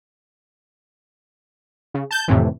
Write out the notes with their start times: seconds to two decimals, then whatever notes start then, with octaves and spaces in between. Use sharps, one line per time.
1.94 C#3
2.11 A5 G6
2.28 F2 A2 C3 D#3 E3